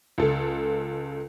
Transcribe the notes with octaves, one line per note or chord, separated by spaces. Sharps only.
C#2 A4